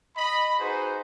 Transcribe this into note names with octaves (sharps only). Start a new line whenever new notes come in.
D#5 B5
D#4 F#4 G#4 B4 C5